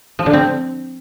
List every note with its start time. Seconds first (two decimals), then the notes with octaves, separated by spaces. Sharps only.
0.19 F3
0.26 D3
0.33 C4